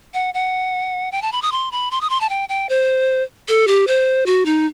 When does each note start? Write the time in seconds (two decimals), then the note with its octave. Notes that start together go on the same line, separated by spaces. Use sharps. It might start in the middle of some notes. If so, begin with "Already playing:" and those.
0.14 F#5
0.34 F#5
1.12 G5
1.22 A5
1.32 B5
1.42 D#6
1.52 C6
1.72 B5
1.91 C6
2.01 D#6
2.10 C6
2.21 A5
2.29 G5
2.49 G5
2.69 C5
3.48 A4
3.67 G4
3.87 C5
4.26 F#4
4.45 D#4